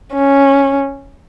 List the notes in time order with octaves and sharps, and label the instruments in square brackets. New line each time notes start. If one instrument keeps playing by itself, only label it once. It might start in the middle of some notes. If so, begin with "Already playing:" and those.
[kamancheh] C#4